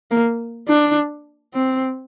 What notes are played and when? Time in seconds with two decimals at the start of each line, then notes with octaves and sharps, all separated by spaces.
0.11 A#3
0.68 D4
1.54 C4